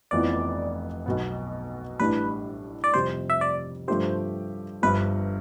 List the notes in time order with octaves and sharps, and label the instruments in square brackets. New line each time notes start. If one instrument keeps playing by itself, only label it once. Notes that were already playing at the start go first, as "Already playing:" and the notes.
[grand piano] F1 F2 E3 B3 F4 [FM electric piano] D5
[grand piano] B1 B2 B3
[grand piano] A1 A2 G3 D4 [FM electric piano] B4
[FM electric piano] D5
[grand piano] F2 C3 G3 [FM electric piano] C5
[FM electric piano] E5
D5
[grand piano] G2 F3 A3 D4 G4 [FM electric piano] C5
[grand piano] G1 G2 F3 [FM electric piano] B4